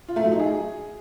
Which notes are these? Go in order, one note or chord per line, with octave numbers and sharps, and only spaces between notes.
F4
A3
F#3
D#4
G#4